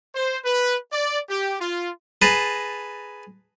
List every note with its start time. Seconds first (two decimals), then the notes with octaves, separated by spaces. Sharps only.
0.15 C5
0.44 B4
0.92 D5
1.29 G4
1.60 F4
2.22 G#4 B4 A5 A#5